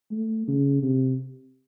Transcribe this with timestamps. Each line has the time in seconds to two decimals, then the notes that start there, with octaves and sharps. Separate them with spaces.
0.11 A3
0.48 C#3
0.82 C3